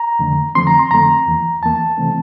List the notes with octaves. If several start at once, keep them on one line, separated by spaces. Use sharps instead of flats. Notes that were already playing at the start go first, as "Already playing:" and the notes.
Already playing: A#5
F2 D3 A3
F2 D3 F3 A3 C4 C6
A#5
C6
F2 D3 F3 A3 C4 A#5
E2 E3 A#3
E2 E3 A#3 A5
C3 E3 A3 C4